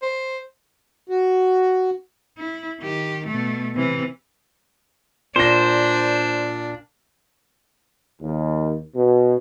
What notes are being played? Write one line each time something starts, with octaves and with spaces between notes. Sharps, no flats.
C5
F#4
E4
D#3 G4
B2 A3
C3 E3
A#2 D4 C5 A#6
D#2
B2